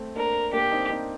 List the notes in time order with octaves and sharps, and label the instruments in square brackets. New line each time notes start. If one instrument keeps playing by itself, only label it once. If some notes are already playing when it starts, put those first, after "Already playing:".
Already playing: [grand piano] A3 C4
[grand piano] A#3 D4 [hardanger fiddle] A#4
[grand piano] A#3 D4 [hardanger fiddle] G4
[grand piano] C4 D#4
C4 D#4